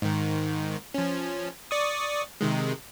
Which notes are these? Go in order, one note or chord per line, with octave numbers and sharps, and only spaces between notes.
G#2 D#3
F3 C#4
D5 C#6 D#6
C3 D#3 G#3